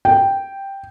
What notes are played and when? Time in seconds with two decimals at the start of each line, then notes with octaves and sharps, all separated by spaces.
0.05 G5